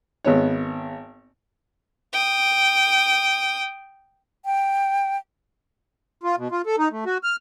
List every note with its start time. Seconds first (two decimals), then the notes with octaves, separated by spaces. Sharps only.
0.25 G#1 B3 C#5
2.13 G5 D#6
4.45 G5
6.23 F4
6.38 B2
6.52 F4
6.66 A4
6.78 D#4
6.92 A3
7.06 F#4
7.23 F6